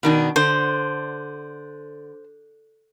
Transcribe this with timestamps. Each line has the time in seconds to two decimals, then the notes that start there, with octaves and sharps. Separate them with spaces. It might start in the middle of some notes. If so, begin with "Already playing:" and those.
0.03 B2 D#3 D4
0.36 D3 C5